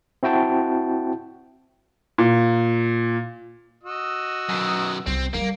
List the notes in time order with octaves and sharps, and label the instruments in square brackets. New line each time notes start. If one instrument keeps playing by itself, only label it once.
[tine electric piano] C4 E4 F#4 G5 A5
[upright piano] A#2
[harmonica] F#4 D#5 E6
[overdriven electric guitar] F#2 B2
[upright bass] C2 [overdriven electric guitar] C4
[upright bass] F3 G3 [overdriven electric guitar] A#3